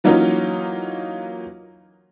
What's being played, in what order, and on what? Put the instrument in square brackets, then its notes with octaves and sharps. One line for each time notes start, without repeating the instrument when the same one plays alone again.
[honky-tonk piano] E3 F#3 A#3 C#4 D#4 F4